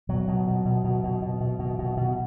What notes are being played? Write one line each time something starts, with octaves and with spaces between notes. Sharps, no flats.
B2 F#3
B2
B2
B2
B2
B2
B2
B2
B2
B2
B2